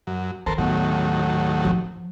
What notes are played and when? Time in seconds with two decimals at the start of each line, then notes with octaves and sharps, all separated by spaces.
0.07 F#2
0.46 D#3 A4 A#4 C5
0.58 D#2 A2 F#3 B3
1.65 F3